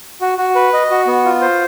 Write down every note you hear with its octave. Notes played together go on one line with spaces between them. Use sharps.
F#4
F#4
B4
D#5
F#4
B3
F4
C5